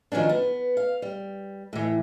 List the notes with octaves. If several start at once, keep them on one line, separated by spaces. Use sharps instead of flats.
D#3 F3 F#3 C#4 D4
B3
F5
G3
A2 E3